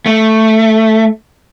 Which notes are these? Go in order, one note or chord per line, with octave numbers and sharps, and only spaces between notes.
A3